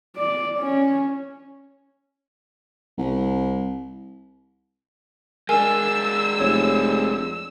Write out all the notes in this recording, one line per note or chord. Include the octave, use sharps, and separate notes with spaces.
D5
C#4
C2
G#3 D4 A#4 G#5 E6
F1 C#5